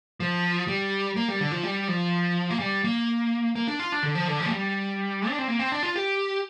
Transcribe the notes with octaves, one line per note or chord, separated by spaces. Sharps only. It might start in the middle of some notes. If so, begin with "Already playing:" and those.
F3
G3
A#3
G3
D3
F3
G3
F3
A#3
G3
A#3
A#3
D4
F4
D4
D3
F3
D3
F3
A#3
G3
D4
C4
A#3
C4
D4
F4
G4